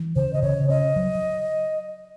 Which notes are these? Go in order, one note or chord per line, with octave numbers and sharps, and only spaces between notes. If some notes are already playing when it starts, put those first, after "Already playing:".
Already playing: E3
C#3 C5
D#5
C#3 C#5
C#4 D#5
F#3